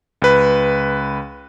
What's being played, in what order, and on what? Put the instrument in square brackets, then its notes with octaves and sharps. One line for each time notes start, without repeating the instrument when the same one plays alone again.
[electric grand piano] C#2 B4